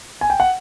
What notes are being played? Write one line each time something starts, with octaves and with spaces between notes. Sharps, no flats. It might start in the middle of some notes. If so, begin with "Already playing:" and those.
G#5
G5
F#5